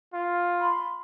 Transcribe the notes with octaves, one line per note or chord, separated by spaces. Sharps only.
F4
B5 C6